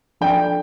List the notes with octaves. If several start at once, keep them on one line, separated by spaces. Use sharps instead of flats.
F3 D4 A4 D5 G5